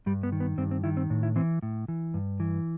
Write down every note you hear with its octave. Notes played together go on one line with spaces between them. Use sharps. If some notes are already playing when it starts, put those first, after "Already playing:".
G2 G3
B3
D#3
B3
G2 C4
C4
D#3 E4
C4
A2
E4
E3 C4
A2
E3
G2
E3